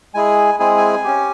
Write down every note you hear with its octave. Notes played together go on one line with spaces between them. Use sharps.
G#3 E4 G#4 G#5
G#3 C4 E4 G#4 G#5
G#5
C#4 G4